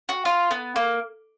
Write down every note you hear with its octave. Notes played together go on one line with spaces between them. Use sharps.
F#4
F4
B3
A#3